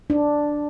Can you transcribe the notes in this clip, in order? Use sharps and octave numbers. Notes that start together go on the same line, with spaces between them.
D4